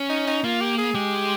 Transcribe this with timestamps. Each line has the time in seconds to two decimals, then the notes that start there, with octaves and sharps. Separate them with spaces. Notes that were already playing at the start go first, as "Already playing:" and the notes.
Already playing: C#4
0.10 D#4
0.27 D#4
0.44 A#3 F4
0.60 G4
0.78 G#4
0.94 G#3 G4